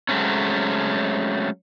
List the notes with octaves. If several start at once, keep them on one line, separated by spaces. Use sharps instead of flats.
F#3 G#3 A3 C4 C#4